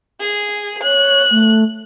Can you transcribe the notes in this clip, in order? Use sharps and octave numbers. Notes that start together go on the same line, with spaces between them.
G#4
C#5 F#6
A3